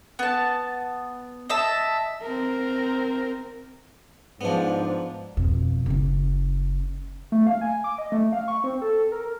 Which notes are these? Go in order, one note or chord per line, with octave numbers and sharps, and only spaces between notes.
B3 A5
D#5 E5 A5
C4 A#4
G#2 F3 B3 D4 C5 D5
F2 B2
F#1 C#4
A3
F5
G#5
D6
D#5
A3
F5
C#6
C4
A4
A#4